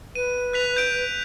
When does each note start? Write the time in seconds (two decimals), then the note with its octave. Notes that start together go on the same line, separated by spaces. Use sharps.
0.15 B4 D#7
0.53 F#6 B6 F7
0.76 G6 D7